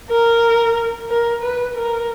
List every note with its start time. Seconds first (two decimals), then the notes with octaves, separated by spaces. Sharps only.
0.11 A#4
1.10 A#4
1.43 B4
1.75 A#4